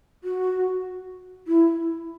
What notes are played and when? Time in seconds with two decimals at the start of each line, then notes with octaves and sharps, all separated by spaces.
0.24 F#4
1.47 E4